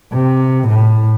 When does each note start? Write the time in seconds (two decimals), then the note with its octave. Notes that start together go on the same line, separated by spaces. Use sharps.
0.13 C3
0.68 A2